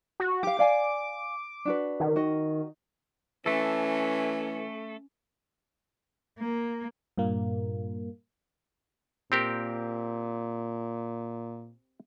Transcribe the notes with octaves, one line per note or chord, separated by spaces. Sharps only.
F#4
G4 F5 D6
D5 F5 G#5
D4 F#4 B4
D#3
F#4 D#5
E3 A3 C#4 A4
A#3
G2 A#2 A#3
A#2 C4 G4 A#4